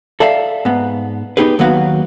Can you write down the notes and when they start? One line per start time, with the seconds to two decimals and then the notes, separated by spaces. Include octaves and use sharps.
0.20 A4 D5 E5 F5
0.65 G#2 B3
1.37 B3 D#4 G4 G#4 B4
1.59 D#2 F#3 B3 F#4 F5